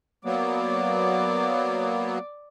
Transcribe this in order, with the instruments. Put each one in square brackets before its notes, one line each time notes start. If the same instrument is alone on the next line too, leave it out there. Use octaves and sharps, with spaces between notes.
[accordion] F#3 A#3 B3 [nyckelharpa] D5